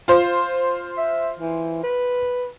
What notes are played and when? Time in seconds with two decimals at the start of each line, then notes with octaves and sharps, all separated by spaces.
0.08 F4 C5
0.98 E5
1.40 E3
1.83 B4